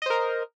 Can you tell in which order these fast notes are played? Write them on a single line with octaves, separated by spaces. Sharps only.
D#5 C5 A#4